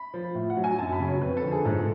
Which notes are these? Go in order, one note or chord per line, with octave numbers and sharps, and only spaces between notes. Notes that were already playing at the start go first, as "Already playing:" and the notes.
Already playing: B5
F3
A2
F#5
F#3
G#5
F#2 A5
B5
C#3 F#3
C#5
F2 B4
A4
D3 F3
G#4
G#2 A4